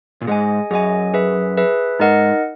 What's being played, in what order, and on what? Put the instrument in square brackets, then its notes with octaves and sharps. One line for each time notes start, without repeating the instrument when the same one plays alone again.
[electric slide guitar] A#2
[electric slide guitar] G#2 [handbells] G#4 D#5 G#5
[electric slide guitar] F#2 [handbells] G#4 D#5 G#5
[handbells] G#4 B4 E5
G#4 B4 E5
[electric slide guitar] G#2 [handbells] D#4 A#4 D#5 F#5